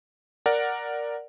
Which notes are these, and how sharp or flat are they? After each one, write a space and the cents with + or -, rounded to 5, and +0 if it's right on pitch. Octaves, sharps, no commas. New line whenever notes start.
A#4 +0 D5 +0 F#5 +0